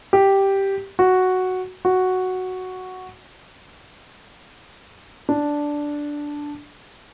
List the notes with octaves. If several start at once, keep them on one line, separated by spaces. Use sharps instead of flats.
G4
F#4
F#4
D4